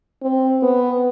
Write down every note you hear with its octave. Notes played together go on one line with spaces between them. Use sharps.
C4
B3